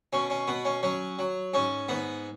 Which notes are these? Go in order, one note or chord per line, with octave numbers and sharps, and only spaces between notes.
B2 C#4
C#4
B2 B3
C#4
F#3 C#4
F#3
G#2 C#4
G#2 B3